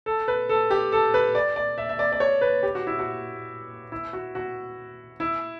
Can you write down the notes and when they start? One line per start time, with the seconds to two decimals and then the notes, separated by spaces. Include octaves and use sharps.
0.06 A4
0.28 B4
0.49 A4
0.71 G4
0.92 A4
1.14 B4
1.35 D5
1.56 D5
1.78 E5
1.89 E5
1.99 D5
2.12 D5
2.20 C#5
2.41 B4
2.63 G4
2.75 F#4
2.87 E4
2.99 F#4
3.92 E4
4.13 F#4
4.35 F#4
5.20 E4